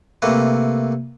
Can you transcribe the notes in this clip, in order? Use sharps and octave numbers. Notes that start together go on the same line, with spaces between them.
C3 A3 A#3 B4